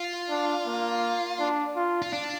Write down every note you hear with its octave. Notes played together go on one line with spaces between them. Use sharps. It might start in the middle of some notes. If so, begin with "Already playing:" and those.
Already playing: F4
D4
A#3
D4
F4
F4
D4